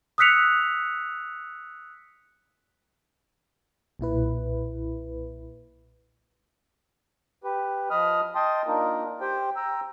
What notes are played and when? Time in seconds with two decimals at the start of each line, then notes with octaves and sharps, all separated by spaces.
0.18 D#6 E6 F#6 B6 C#7 F7
3.99 B1 A#2 E4 B4
7.44 G4 B4
7.90 F3 D#5 B5 D#6 F6
8.35 D#5 G5 A5 C6 D#6
8.67 A#3 D4 D#4 F4 A#4
9.21 G4 C5 G5
9.56 G5 A#5 E6